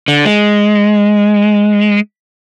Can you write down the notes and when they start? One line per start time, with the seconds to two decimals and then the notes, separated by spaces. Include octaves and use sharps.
0.08 D3
0.25 G#3